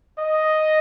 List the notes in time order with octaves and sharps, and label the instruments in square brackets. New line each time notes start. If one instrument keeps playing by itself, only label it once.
[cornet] D#5